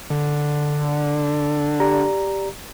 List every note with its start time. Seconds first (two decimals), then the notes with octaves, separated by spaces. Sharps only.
0.10 D3
1.80 G4 D5 A#5